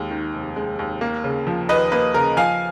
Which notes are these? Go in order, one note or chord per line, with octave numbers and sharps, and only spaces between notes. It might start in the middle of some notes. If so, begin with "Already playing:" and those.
Already playing: D#2 G#3
D#3
F1
G#3
D#2
A#3
C#3
F3
D#2 B4 D#5
A#3 B4
C#3 A#4
F3 F5 G#5